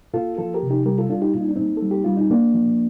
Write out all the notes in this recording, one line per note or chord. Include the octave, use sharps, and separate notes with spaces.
A#2 F4 A4
F3 F4 A4
G4 A#4
C3
D#4 G4
G3 G4 A#4
F4 A4
G3 D4 F4
D#4 G4
A#2 F4
D#4
D4
A#2 C4 D#4
G3 A4
G4
G3 F4
D#4
A#2 A#3 D4
F3